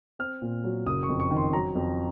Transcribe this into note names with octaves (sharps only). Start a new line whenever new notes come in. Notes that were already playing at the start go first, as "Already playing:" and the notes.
C4 F6
A#2
F#3
F#1 D#6
C#6
F2
C#6
D#3
C6
F#3 A#5
F2